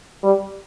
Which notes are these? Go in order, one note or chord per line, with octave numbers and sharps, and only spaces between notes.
G3